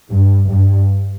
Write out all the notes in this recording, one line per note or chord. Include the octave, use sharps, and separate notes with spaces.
G2
G2